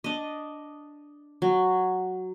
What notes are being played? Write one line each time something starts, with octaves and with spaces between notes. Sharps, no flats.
D4 D#5
F#3